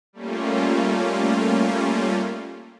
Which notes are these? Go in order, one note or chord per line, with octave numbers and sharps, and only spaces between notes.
G3 A3 A#3 C#4 F4